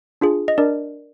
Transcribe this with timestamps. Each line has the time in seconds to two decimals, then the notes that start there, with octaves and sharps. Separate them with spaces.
0.21 D4 F4 G#4
0.48 D#5
0.58 D4 A#4 D5